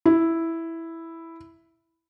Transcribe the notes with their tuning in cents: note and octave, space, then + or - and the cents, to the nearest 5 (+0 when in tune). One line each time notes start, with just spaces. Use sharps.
E4 +0